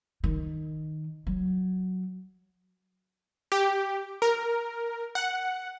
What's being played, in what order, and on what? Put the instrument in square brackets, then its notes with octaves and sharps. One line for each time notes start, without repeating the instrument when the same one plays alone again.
[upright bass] D#3
F#3
[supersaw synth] G4
A#4
F#5